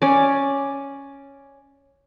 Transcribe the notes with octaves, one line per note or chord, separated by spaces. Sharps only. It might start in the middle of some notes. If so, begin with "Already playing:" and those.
C#4 D5